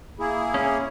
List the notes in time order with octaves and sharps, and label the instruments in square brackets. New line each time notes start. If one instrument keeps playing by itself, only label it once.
[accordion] A#3 E4 G#4
[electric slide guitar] C#4